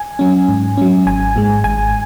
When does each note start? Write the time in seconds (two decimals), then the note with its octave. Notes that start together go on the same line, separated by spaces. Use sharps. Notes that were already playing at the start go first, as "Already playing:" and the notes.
Already playing: G#5
0.19 F#3 C#4
0.49 G#2
0.77 F#3 C#4
1.06 G#1 G#5
1.36 G#2 G#3
1.64 G#1 G#5